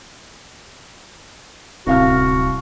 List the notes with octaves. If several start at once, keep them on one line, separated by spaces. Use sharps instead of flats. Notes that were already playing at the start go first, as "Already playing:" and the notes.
D1 C2 F#4 F5 F6